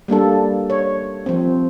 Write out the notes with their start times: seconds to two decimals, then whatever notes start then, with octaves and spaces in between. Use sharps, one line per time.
0.08 G3 A#3 D4 A4
0.70 C#5
1.26 F3 C4